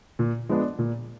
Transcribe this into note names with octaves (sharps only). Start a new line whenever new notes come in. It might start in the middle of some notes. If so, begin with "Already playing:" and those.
A#2
F3 G#3 B3 D4
A#2